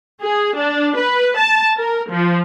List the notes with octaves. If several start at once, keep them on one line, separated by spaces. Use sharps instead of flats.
G#4
D4
B4
A5
A#4
F3